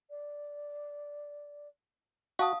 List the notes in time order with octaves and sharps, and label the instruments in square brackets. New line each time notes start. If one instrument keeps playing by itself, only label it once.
[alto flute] D5
[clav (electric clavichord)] F#4 [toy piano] F5 A5 D#6